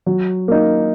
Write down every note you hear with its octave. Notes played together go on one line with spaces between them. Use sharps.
F#3
A#3 D#4